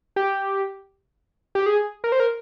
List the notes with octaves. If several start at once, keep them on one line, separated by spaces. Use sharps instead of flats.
G4
G4
G#4
A#4
C5
A#4